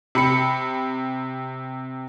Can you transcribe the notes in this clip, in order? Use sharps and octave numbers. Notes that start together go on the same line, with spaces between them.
C3 B5 C#7